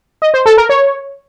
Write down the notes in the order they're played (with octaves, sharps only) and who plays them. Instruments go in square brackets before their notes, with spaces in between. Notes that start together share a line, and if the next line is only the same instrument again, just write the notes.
[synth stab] D#5
C5
A4
A#4
C#5